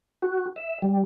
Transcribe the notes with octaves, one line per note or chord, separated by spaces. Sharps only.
F#4
E5
G3